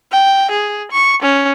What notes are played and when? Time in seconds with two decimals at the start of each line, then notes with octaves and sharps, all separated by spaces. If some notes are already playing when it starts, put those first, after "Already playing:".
0.12 G5
0.51 G#4
0.92 C#6
1.22 C#4